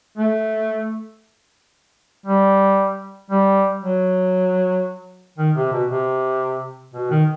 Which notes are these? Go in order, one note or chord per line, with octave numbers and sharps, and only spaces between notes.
A3
G3
G3
F#3
D#3
C3
B2
C3
B2
D#3